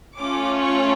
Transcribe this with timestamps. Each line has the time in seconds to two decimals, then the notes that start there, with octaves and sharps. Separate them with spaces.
0.18 A3 C#4 F4 D6
0.61 C#6